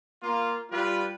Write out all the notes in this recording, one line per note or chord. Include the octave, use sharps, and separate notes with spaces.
A#3 F4
G3 F4 G4 B4